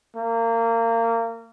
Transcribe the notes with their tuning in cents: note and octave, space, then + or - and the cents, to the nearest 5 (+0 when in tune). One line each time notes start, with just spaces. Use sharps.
A#3 -25